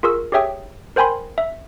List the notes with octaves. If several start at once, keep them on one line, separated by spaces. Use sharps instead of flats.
F4 G#4 A#4 C#6 E6
G4 G#4 C#5 E5 G5 D#6
A#4 C5 G5 G#5 B5 C6
E5